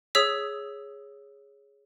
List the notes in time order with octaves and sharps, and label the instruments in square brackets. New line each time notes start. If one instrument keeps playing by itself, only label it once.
[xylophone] G#4 C#5 D#6 E6 B6